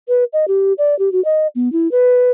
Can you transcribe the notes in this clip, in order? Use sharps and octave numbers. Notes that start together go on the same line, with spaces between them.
B4
D#5
G4
D5
G4
F#4
D#5
B3
E4
B4